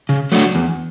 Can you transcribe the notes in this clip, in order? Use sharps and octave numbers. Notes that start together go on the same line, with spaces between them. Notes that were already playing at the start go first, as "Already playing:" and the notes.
C#3
F#3 A3 D4 F#4
E2